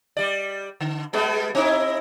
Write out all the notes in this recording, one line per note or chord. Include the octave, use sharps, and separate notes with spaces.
G3 D5
D3
G3 G#3 B3
C4 D#4 E4